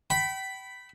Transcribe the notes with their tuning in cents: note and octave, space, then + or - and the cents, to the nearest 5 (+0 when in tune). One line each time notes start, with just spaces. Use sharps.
G5 -35 B5 +0